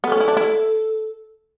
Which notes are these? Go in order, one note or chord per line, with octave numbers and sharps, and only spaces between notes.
B3 A4
C#4
E4
D4
E4